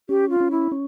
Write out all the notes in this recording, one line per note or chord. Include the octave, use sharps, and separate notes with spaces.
C#4 G4
F4
C#4
E4
C#4